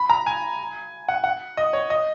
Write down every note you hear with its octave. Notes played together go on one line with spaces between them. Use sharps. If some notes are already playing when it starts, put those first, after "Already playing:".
Already playing: B5
A#5
G#5
F#5
F#5
D#5
C#5
D#5